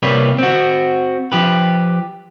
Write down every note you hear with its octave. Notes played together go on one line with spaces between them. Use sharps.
C3 G3 A#3 B4 C#5 D5
C4 F#4
F3 G4 B4